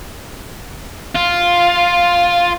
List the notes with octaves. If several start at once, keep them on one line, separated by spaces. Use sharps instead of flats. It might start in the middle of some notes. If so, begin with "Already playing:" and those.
F4